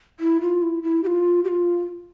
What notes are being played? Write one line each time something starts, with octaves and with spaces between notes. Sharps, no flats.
E4
F4
E4
E4
G4
F4
G4
F4